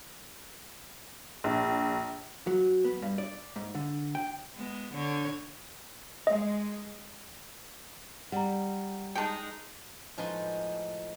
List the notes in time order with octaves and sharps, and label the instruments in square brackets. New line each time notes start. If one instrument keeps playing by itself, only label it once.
[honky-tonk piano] A#1
[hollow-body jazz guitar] F#3
B3
G2
D5
G#2
D3
G5
[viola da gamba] G#3 B3
D3 C#5
[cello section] G#3 [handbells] D#5
[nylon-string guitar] G3 [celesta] F#5 A#5
[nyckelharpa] G#3 D#4 [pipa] G5 A5
[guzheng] A2 F3 G#3 D#4 B4 C6